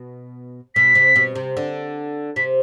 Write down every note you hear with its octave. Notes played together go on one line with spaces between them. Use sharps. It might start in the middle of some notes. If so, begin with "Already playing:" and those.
Already playing: B2
B2 B6
C3
B2
C3
D3
C3 B6